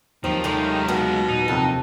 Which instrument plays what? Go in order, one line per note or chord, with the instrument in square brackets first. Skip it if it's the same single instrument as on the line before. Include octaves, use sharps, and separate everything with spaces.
[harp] D#2 F#3 G6 [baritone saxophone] D#3 [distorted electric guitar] F3 [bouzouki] C4
[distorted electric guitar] G#3 F4 [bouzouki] A3 D#4 G4
[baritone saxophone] B2 [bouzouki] A#4
[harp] A#2 [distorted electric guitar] D#4
[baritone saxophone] F2 [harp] C3 [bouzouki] A5